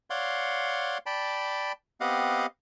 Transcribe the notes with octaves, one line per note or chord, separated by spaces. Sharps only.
C#5 D5 F5 F#5 C6
D5 G5 A5 B5
B3 C4 G4 D#5 F5 F#5